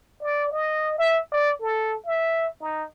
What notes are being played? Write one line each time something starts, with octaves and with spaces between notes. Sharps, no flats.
D5
D#5
E5
D5
A4
E5
D#4